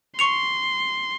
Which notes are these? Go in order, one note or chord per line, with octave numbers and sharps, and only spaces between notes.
C6 C#6 C#7 F7